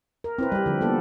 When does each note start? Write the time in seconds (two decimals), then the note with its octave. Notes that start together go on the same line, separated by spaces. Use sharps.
0.24 A#4
0.38 C4 E4 B4
0.52 G3 G4
0.66 D3 F3
0.81 A#3 B3 A4